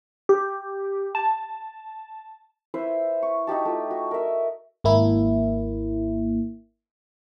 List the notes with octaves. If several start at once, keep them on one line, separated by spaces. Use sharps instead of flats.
G4
A5
E4 B4 C5 E5
C#6
D#4 F#4 G4 A5
A3 F4
F#4
A#4 E5
G#1 A#3 E4